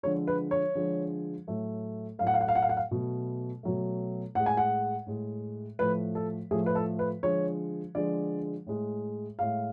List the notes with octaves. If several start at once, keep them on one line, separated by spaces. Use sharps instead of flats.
D3 F3 G#3 C#5
B4
C#5
D3 F3 G#3
A2 F#3 A3
A2 F#3 A3 F5
F#5
F5
F#5
F5
F#5
F5
F#5
F5
B2 F#3 A3
B2 F#3 A3
A2 G#3 F#5
G#5
F#5
A2 G#3
A2 F3 A3 B4
A4
A2 F3 A3 G#4
B4
A4
B4
D3 F3 G#3 C#5
D3 F3 G#3 D5
A2 G#3
A2 G#3 F5